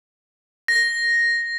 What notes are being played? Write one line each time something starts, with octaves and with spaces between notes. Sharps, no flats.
A#6